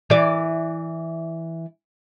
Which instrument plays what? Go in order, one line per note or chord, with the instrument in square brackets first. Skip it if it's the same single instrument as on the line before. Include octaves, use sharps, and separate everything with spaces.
[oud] E3 D5